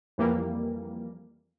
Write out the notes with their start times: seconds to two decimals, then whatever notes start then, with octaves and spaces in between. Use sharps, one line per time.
0.18 F2 E3 G3 A#3